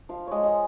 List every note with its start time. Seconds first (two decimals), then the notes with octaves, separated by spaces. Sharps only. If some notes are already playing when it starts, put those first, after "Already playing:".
0.09 F3 F5
0.27 G#3 C#5 D#5
0.43 D#5